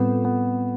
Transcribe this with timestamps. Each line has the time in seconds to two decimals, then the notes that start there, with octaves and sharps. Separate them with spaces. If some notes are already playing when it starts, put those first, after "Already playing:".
Already playing: A2 G3 B3 C4 F4 A4
0.25 B3